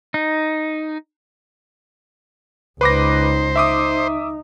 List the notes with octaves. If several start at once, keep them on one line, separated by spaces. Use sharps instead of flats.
D#4
C#2 D#4 B4 C5 D6 A#6
D#4 E5 D6 D#6